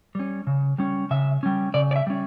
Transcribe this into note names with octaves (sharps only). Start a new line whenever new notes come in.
G3 C#4
C#3
G3 C#4
C#3 E5
G3 C#4
C#3 D5
D5
E5
G3 C#4